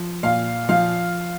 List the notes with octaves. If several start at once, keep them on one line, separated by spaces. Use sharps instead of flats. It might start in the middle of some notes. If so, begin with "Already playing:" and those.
Already playing: F3
A#2 F5
F3 F5